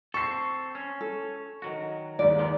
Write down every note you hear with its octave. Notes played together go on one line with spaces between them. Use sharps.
C4 A4 C#6 C7
C#4
A4
D#3 F#3 F#4
D#2 G#2 D5
F3 A#3 B3